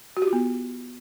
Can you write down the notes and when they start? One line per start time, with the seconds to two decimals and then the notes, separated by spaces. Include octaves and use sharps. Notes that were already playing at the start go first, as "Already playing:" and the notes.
0.17 F#4
0.22 G4
0.27 F4
0.33 B3